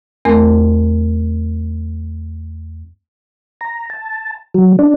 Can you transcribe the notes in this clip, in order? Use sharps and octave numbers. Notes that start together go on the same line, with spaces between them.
E2 A3 C4 A#4
A#5
A5
F#3
D4